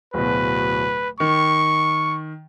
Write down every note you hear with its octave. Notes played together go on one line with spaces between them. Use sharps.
D1 B2 B4
D#3 C#6